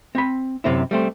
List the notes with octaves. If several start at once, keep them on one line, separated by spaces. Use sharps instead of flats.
C4 B5
F#2 C3 C4 E4
G3 A3 C4